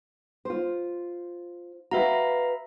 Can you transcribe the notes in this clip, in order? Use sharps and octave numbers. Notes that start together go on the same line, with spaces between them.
F4 C5
F#4 B4 E5 F5 A#5